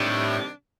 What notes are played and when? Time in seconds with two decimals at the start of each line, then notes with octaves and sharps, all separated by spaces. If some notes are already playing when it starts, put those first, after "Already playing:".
Already playing: A2 C3 D#3 G3 D4